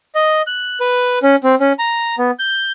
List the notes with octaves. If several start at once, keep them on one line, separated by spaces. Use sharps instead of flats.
D#5
F#6
B4
C#4
C4
C#4
A#5
B3
G6